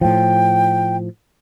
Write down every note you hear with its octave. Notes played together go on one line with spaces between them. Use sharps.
A2 F3 G5